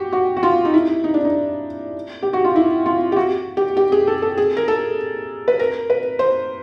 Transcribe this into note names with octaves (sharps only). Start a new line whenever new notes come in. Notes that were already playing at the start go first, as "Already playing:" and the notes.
Already playing: F#4 G4
F#4
F#4
F4
D#4
E4
D#4
D4
D#4
G4
F#4
F4
E4
F4
G4
F#4
G4
G4
G#4
A4
A4
G#4
A#4
A4
B4
A#4
B4
C5